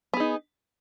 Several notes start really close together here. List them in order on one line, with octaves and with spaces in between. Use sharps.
B3 G#4 D#4